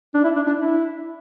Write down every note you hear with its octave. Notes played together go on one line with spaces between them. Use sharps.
D4
E4
D4
D4
E4